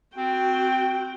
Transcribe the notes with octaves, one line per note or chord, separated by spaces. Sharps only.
C4 F#4 G5